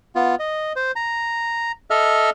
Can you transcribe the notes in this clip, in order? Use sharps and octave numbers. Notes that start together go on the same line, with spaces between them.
B3 F4
D#5
C5
A#5
A4 D#5 E5 F6